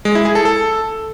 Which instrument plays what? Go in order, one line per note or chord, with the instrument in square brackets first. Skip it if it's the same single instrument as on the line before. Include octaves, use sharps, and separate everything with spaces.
[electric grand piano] G#3
E4
G#4
A4
A4